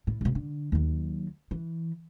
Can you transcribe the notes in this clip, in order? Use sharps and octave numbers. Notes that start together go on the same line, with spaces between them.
A2
G#2 B2
D3
D#2 F#3
E3